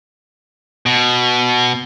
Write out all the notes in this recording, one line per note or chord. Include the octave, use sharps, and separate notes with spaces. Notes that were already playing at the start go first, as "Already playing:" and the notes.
B2